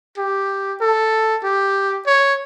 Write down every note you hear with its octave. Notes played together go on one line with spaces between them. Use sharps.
G4
A4
G4
C#5